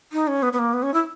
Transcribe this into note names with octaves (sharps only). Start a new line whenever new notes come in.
D#4
C#4
B3
B3
A#3
B3
C#4
E4